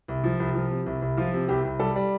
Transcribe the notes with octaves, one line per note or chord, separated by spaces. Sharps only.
C2
F3
C2
F3
C3
C2
C2
F3 F4
C3
C2 G4
C2
G3 A4
G3